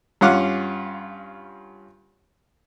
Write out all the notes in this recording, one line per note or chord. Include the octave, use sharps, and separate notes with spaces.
G2 C#4 F4 F#5 D6 F6